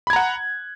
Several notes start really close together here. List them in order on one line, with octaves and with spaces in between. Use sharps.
B5 G#6 A#5 F#5 F#6